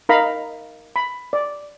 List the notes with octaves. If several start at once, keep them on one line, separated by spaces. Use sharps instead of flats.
D#4 A#4 D#5 F5 A#5 B5
B5
D5